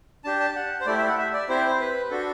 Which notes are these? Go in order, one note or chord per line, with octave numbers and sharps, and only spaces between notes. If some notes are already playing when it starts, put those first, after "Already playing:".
D4 G4 A5
A5
F#5
C5
A3 E4 G4 D5
E5
F#5
E5
D5
C4 E4 G4 C5
C5
B4
D4 F#4 A4